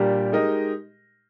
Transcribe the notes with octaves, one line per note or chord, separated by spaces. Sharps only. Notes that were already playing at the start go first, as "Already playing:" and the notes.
Already playing: A#2 G3 D4 G4 A#4
G#3 D#4 G4 A#4 D#5